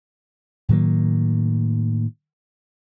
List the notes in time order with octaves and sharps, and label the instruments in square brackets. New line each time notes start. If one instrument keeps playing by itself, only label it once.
[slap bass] A2 D#3 F#3 A#3